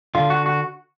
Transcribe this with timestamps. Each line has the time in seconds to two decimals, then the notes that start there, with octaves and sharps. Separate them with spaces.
0.15 D3 F4
0.30 F#4
0.46 F#4